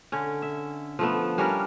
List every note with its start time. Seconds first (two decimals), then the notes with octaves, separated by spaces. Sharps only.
0.12 D3 C#4
0.42 E5
0.99 F3 A3 B3
1.38 G3 C#4 D4 A#4